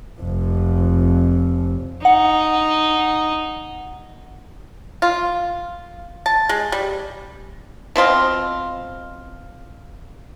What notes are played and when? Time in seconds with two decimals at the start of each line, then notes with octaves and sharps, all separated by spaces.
0.20 F1 F2
2.05 D#4 F#5
5.02 F4
6.26 A5
6.49 G#3
6.72 G3
7.96 B2 C4 F4 D#5